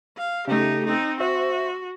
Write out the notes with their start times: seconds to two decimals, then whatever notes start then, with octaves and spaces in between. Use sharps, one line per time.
0.17 F5
0.47 C#3 A3 D#4 G4
0.86 C4 D#4
1.20 F#4 C5 E5